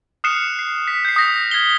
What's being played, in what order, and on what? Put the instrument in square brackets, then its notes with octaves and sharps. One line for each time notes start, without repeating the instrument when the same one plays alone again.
[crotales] D#6 F6 F#6 C7 C#7 E7
C7
B6
G6 C7
D#6 A#6 B6
F6 G#6 B6 C7 G7